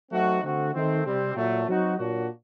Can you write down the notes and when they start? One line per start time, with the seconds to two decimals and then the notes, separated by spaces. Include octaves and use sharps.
0.11 F#3 A3 C4 D#4 F#4
0.42 D3 A3 C4 F#4
0.73 D#3 A3 C4
1.04 C3 G3 C4
1.34 A#2 F#3 A3
1.66 F#3 C4 D#4 F#4
1.96 A#2 F#3 A#3 D4 F#4